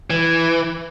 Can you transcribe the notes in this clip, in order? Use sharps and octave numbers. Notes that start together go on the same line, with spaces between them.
E3